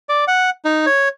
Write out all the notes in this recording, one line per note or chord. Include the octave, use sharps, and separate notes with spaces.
D5
F#5
D#4
C#5